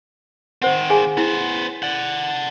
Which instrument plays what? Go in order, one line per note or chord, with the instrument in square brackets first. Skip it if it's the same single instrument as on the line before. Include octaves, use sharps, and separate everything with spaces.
[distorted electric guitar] D#3 C4 [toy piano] C5 F#5
[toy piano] G#4 F5 G#5
[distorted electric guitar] B3 C5 [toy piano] E4
[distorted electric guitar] D5 F#5